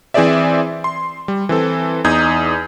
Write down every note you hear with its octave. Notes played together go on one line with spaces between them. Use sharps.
E3 C4 G#4 C5 D5 E5
C6
G3
E3 C4 A4
E2 D#4 D#6 G6 G#6